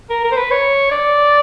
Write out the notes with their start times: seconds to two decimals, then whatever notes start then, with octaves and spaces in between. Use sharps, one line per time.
0.10 A#4
0.24 A#4
0.31 C5
0.37 B4
0.51 C#5
0.91 D5